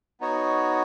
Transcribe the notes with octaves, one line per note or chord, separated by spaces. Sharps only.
B3 D#4 F#4 C#5